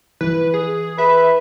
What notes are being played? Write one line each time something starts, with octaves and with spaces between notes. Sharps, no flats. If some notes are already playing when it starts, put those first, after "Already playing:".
E3 B4
G#4
B4 E5